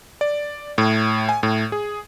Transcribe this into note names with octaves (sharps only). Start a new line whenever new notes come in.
D5
A2
G#5
A2
G#4